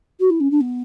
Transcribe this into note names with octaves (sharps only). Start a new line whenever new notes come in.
F#4
E4
C#4
D4
B3